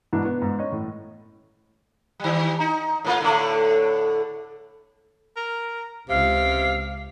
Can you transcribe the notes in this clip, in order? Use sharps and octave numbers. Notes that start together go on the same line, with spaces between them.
G#2 B2 E3 B3 D4 E4
B3
G#2
C#4 D#5
A2
D#3 G3
D#4
A2 A#3 F4
A2 D3 A3
A#4
C#2 C3 F5